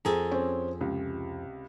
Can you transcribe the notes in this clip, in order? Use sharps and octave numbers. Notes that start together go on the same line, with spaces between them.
F2 G#4 A4 A#5
C4 C#4
C#2 C3